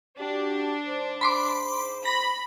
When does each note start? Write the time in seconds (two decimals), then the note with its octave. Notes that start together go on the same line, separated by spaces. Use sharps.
0.19 D4 F#4 G4
0.85 G#2 C5
1.21 B5 C6 D6
2.05 B5 A#6